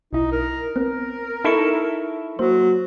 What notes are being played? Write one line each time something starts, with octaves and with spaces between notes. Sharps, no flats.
B1 D#4 E4
A#4
B3 C4 A#4
D#4 E4 A4 E5 C#6
F#3 A#3 C5